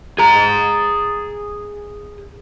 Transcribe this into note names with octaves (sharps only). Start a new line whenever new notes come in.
G#4 A#5